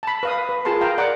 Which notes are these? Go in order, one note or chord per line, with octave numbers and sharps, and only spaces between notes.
A5 B5
B4 F5 D#6
B4
F4 G#4 A#4 A5 C6
F5 G5 A#5
A#4 D5 F#5 D6